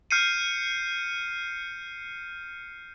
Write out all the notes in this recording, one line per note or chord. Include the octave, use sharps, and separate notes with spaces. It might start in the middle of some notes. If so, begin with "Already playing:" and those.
F6 G6 C7 C#7 D#7